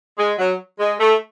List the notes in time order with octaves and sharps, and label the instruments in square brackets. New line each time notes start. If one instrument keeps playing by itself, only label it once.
[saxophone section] G#3
F#3
G#3
A3